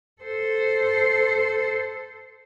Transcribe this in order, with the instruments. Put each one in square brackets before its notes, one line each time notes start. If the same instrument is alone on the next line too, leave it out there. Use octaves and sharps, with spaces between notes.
[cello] A4 C5